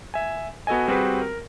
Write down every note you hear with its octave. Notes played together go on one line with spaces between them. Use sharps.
E5 G#5
B3 F#4 A4 D#5 G#5
G3 C4 F#4 G#4 B4
A#4